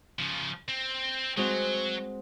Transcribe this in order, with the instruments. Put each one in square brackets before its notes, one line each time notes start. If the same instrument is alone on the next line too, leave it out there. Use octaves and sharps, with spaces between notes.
[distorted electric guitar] C#3 F3
C4
[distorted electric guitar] F#3 [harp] G#3 C4 F#4